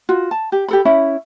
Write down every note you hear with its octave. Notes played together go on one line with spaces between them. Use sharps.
F4 F#4
A5
G4
G4 A4 B5
C#4 E4 B5